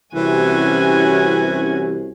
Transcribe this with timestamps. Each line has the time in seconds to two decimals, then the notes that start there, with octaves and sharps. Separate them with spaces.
0.15 C2 C3 E3 C#4 F#4 G#5